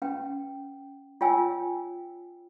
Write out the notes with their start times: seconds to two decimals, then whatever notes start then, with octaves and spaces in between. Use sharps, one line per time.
0.02 C#4 B4 F#5 G5
1.21 F4 C#5 G5 G#5 E6